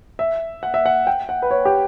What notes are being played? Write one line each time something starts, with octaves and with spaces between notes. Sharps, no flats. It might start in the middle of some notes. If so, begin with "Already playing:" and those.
E5
F#5
E5
F#5
G5
F#5
B4
C#5
G4